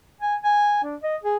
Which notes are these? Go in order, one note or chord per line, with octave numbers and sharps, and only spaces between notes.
G#5
G#5
D4
D#5
G#4